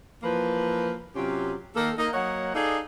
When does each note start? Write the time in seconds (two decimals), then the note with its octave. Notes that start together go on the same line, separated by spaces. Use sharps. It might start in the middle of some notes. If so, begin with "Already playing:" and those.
0.23 E3 F3 A#3 B4
1.15 C3 F#3 C#4 F4 G4
1.76 D#3 A#3 A4
1.98 A#3 D#4 D#5
2.13 F#3 A#3 C#5 D#5 F#5
2.55 D#4 G#4 A4 D5 D#5 F5